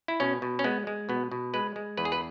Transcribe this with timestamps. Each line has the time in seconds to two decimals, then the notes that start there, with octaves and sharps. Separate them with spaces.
0.08 E4
0.20 B2 C#4
0.42 B2
0.59 C#4
0.64 G#3 B3
0.87 G#3
1.09 B2 B3
1.32 B2
1.54 G#3 B4
1.76 G#3
1.97 E2 B4
2.05 G#4
2.12 B4